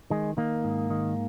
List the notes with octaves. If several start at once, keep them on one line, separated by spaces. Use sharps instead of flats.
D#3 G#3
D#3 A#3
G#2
D#3